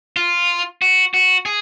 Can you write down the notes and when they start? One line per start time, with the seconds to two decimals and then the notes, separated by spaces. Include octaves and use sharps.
0.16 F4
0.82 F#4
1.14 F#4
1.46 G#4